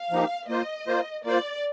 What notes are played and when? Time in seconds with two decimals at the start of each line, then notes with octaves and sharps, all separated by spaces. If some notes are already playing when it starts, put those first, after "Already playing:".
Already playing: F5
0.11 F3 A#3 D#4 G4
0.49 A#3 F4 C5 D#5
0.87 A#3 F4 C5
1.25 A#3 F4 C5 D5